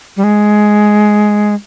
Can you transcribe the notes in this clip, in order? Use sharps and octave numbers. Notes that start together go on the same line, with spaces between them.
G3
G#3